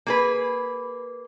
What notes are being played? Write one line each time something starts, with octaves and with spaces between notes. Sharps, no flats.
A#3 G#4 B4